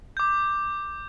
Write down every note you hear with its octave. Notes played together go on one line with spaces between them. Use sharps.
D6 G6